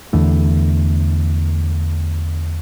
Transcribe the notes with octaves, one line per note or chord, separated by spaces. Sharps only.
E2 D3 E3 A3